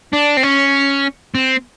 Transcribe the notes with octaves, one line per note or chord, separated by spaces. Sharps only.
D4
C4
C#4
C4